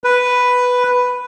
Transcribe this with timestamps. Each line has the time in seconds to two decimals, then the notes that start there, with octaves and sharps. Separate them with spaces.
0.04 B4